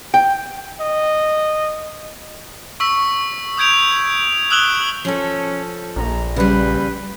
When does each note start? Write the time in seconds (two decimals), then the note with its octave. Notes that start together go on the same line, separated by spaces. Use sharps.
0.14 G5
0.80 D#5
2.80 C#6 E6 B6
3.57 D#6 G6 G#6 D7 F7
4.50 D#6 E6 F#6 E7 F#7 G7
5.05 F3 C#4 A4
5.96 A#1 A#5
6.36 C#3 G3 B4